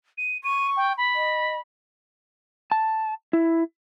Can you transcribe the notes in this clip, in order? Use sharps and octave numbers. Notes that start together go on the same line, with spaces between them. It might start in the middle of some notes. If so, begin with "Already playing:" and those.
D#7
C#6 D#7
G5
B5
D#5
A5
E4